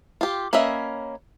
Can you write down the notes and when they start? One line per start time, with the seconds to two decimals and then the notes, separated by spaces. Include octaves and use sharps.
0.21 F4 G4
0.53 A#3 C#4 B4 D#5 E5